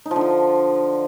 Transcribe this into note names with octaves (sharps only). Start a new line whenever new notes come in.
D#4
F3
D3
F4